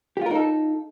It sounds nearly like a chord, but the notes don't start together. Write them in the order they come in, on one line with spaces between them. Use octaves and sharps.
G4 F4 A#4 D#4 A4